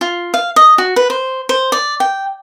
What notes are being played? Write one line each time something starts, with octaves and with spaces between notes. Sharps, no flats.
F4
F5
D#5
F#4
B4
C5
C5
D5
G5